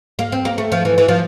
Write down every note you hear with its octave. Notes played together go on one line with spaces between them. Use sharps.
A#3
C4
A#3
A3
F3
E3
E3
F3